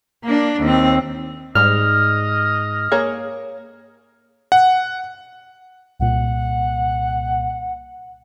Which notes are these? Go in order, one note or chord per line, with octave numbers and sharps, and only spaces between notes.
A#3 D4
D#2 C4
G#2 G3 D#5 F6
A#3 G#4 C#5
F#5
C2 A#2 F#5